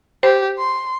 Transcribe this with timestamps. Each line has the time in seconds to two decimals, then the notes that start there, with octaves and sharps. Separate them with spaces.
0.23 G4 C5
0.58 C6